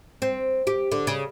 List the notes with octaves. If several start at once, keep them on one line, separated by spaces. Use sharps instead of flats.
C4
G4
D3
C#3